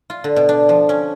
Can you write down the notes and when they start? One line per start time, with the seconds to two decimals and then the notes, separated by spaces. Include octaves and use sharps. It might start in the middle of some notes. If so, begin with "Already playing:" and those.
0.10 F4
0.24 D3
0.36 B2
0.49 D4
0.69 F3
0.89 C#4